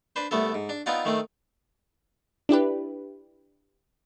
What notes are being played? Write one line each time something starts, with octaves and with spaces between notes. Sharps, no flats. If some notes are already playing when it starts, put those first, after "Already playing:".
D4 B4 C5
C2 A3 B3 A4
G#2
D4
B3 C4 D#4 F4 D5 F#5
D#3 A3 C4
D4 E4 G4 B4